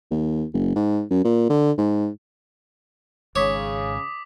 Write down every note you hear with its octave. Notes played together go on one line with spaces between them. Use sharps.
D#2
F#1
G#2
F#2
A#2
D3
G#2
G#1 G#2 C#3 C#5 D6 D#6 B6